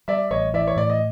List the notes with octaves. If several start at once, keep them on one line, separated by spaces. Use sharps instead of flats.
G3 D5 E5
A1 C#5 D#5
E3 D5 E5
C#5
A2 D5
D#5